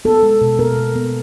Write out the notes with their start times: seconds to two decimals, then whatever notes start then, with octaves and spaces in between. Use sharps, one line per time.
0.05 B3 A4
0.23 G#3
0.41 B2
0.59 B3 A#4
0.77 B3
0.95 B3